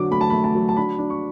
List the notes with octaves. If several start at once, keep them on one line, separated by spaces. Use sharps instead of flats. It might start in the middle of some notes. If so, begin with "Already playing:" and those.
Already playing: D3 F#3 D4 D6
A3 B5
A5
A3 B5
A5
F#3
A5
D4 B5
D4
C#6